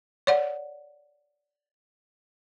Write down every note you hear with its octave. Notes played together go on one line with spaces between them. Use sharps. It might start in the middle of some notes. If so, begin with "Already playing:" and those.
C#5 D5 F#5